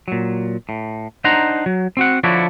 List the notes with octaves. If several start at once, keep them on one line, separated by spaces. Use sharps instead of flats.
A#2 F#3
A2
D4 D#4 C5 F#5 A#5
F#3
C4 F#4 F#5
D3 F3 E4 F#4 C#5 D5